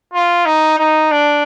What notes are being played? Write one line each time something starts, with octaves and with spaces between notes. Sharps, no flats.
F4
D#4
D#4
D4